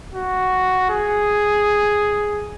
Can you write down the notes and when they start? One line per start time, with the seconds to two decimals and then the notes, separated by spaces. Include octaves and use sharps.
0.14 F#4
0.90 G#4